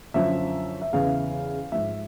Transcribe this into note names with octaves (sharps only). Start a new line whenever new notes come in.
F#2 D3 F3 E5
E5
E2 C#3 E3 F5
G#2 F3 E5